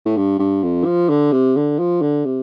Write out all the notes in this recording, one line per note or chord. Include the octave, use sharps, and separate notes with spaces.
A2
G2
G2
F2
F3
D3
C3
D3
F3
D3
C3